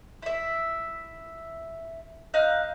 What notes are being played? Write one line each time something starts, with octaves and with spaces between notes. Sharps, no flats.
E4 E5
D#4 F5 F#6